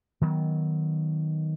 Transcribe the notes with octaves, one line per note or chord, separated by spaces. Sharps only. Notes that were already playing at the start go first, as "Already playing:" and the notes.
D#3 F#3 B3